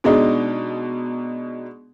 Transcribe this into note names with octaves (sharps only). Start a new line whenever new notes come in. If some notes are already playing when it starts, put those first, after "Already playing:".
B2 G#3 D4 D#4